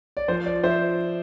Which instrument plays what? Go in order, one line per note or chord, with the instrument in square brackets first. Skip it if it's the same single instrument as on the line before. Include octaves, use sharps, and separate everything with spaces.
[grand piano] D5
F3 C5
D5
F3 C5 E5